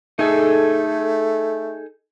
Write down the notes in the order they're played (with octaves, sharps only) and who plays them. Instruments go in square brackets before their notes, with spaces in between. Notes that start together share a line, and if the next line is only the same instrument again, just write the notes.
[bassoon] A3 [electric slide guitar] D#4 G#4 A4